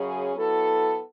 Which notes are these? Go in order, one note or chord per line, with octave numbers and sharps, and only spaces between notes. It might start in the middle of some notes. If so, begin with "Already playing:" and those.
Already playing: F#2 C#3 F#3 C#4 G#4
F#3 B3 E4 A4